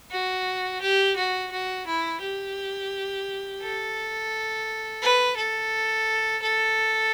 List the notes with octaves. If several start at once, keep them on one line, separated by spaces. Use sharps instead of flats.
F#4
G4
F#4
F#4
E4
G4
A4
B4
A4
A4